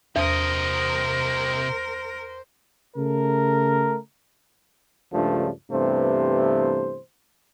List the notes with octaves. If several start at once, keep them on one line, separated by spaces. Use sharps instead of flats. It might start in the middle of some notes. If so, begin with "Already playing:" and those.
E2 C3 A#4 C5 D#5
C#3 A3 A#4
C#2 G2 C#3 F3 A3 D4
G2 C3 E3 A3 B3 C5